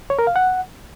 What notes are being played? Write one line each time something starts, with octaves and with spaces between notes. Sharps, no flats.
C#5
A#4
F5
F#5